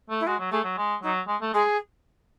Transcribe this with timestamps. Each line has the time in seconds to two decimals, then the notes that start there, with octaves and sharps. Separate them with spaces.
0.10 A3
0.20 E4
0.27 G#3 F#4
0.39 F#3
0.51 A3 G#4
0.64 F#3
0.77 G#3
1.03 F#3 D#4
1.27 G#3
1.41 A3
1.53 G#3 G#4